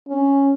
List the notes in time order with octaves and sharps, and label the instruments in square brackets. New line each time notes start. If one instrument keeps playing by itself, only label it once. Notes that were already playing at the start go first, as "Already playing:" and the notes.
[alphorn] C#4